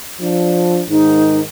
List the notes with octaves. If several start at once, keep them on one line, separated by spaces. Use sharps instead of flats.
F3 D4
G#2 D#3 D#4